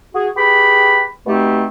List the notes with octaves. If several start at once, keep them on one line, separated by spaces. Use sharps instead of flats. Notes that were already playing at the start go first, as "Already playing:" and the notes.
F#4 G#4
G4 G#4 B4 G5 B5
B2 A3 C4 D#4 G4